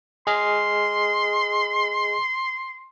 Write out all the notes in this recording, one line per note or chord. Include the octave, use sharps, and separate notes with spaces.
G#4 D#5 C6 F6